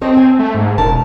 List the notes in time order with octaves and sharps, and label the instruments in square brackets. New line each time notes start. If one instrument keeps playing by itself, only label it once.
[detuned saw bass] C4 [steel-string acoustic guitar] A4 C#5 D#5
[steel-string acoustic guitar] G#5
[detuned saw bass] A3
G#2
[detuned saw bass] E1 [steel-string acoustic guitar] C#4 A#4 A5